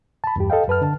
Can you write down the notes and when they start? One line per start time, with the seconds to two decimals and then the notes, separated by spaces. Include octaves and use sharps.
0.24 A5 B5
0.36 E2 G2 G4
0.50 A4 D#5 F5 G5
0.68 F#2 B4 A5 F6
0.82 D3 A5